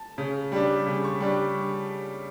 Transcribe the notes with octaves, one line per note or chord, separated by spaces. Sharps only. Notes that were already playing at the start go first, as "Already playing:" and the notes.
Already playing: A5
C#3
G3 D4
C#3
C#6
G3 D4